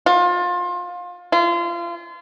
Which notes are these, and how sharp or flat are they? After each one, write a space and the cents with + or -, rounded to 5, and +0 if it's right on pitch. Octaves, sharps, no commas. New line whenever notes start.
F4 +25
F4 -30